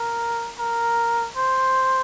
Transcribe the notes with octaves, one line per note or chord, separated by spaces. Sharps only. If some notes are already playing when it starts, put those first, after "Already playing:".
Already playing: A#4
A#4
C5